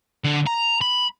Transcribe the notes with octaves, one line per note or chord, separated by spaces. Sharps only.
D3
A#5
B5